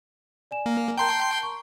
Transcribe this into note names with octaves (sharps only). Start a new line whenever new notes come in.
D5 G#5 E7
A#3
A#4 G5 A5 A#5 C6 G6
C#6